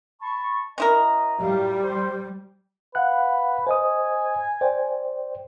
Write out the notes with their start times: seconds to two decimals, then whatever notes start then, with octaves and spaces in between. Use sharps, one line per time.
0.21 A5 B5 C#6
0.78 C#4 E4 A#4 D#5
1.41 A2 G3 F#4 F5
1.82 C5
2.95 B4 F5 F#5 F#6
3.67 C5 D#5 G#5 D#6
4.61 C5 D5 G5